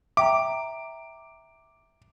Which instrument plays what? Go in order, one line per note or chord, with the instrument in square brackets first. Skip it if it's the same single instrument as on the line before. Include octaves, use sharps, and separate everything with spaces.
[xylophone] E5 G5 A#5 [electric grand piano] D6